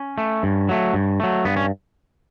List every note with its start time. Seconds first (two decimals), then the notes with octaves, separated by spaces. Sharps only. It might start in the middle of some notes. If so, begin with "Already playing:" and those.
Already playing: C#4
0.18 A3
0.43 G2
0.69 F#3 A3
0.93 G2
1.20 F#3 A3
1.45 G2 B3
1.57 C#4